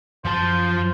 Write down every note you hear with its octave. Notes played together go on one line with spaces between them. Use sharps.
F#2 F3 C5 A5